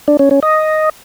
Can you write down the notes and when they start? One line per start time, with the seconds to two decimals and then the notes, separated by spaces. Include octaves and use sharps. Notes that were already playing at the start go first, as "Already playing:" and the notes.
0.08 D4
0.19 C#4
0.31 C#4
0.43 D#5